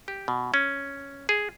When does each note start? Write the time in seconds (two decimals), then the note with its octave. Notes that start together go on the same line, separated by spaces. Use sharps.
0.08 G4
0.28 B2
0.54 C#4
1.29 G#4